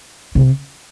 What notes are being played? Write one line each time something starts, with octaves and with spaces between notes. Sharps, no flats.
C3